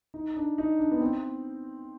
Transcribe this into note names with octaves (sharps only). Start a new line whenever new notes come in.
D#4
D4
D#4
D4
B3
C4